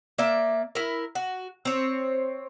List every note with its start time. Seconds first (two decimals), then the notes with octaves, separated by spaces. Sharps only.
0.18 A#3 D5 E5
0.75 E4 A#4
1.15 F#4
1.65 C4 C#5